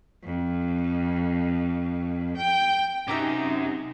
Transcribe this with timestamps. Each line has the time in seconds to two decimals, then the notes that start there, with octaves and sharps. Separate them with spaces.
0.24 F2
2.37 G5
3.08 F#2 C3 D#4 E5 A#5 D6